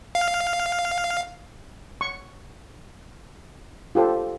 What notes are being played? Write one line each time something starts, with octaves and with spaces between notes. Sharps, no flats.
F5
C#6
F4 G4 A4 C5